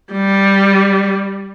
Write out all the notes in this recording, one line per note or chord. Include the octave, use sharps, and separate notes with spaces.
G3